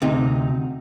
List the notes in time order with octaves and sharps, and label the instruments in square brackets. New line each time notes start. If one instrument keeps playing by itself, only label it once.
[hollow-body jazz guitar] D2 C3 D#4